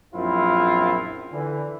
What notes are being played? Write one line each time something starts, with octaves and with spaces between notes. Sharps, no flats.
A#1 F#2 C4 E4 F4
D3 E3